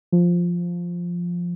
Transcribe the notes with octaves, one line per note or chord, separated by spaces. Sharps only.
F3